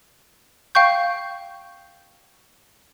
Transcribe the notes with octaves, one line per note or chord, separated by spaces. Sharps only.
F5 G5 C#6 G6